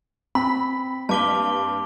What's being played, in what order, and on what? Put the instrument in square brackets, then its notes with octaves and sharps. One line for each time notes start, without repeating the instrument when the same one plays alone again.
[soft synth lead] C4 [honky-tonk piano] B5 [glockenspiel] B6
[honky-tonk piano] G2 A#3 B6 [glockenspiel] A5 D6 G7